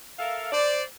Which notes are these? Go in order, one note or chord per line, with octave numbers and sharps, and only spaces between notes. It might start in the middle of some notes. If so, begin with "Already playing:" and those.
A4 A#4 E5 F5
C5 D5